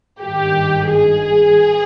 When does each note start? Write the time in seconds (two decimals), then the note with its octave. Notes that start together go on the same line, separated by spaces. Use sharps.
0.21 G#1 G2 D#3 G4
0.89 G#4